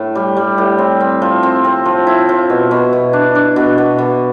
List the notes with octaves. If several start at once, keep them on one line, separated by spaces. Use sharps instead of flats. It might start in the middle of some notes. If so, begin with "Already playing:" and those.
Already playing: A2
G3
G3
A2
C4
C4
F3
C4
C4
F3
E4
F3
B2
B2
B2
D4
D4
B2
B2
B2